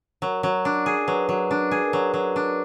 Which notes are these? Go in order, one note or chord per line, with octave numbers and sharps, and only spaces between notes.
F#3 A#4
F#3
D4
G#4
F#3 B4
F#3
D4
G#4
A#4
F#3 B4
F#3
D4